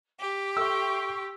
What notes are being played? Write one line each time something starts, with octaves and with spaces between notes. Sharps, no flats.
G4 D6
A4 E5 G5 C6 C#6 E6